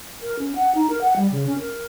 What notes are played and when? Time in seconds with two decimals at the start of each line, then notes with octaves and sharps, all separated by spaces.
0.22 A#4
0.39 C#4
0.56 F#5
0.75 D#4
0.90 A#4
1.01 F#5
1.17 G3
1.31 C#3
1.47 C#4
1.59 A#4